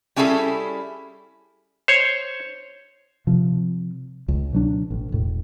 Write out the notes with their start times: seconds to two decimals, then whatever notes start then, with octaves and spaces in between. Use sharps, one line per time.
0.16 G3 C#4 E4 G#4 A4
1.88 C5 C#5
3.27 C3 F3
4.28 C#2
4.53 B2 F#3 D4
4.91 A1
5.12 E1 A2